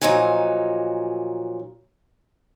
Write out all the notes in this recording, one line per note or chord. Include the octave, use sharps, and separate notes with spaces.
A#2 F3 F#3 D#4 G#5